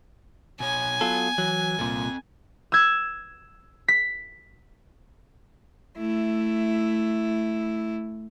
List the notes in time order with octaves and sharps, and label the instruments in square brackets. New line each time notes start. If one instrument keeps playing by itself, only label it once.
[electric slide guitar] B2 C#5 [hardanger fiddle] G#5
[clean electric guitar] F#3 F4 A4 [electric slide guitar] B3
[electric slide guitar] E3 [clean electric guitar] F#3
[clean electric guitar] C2 A#2 [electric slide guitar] C4 A4
[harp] E6 G#6
B6
[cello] A3 E4